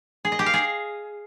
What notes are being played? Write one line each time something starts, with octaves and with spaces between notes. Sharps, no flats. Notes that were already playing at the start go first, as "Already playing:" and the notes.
G#4
D#5
G4
F5
G#4